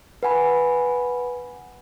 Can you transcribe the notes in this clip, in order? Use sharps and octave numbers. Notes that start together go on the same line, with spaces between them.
B4 F#5 G#5 B5